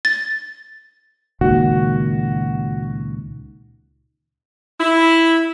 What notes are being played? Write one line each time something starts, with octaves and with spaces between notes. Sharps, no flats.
A6
C#2 A#2 D#3 F#4
E4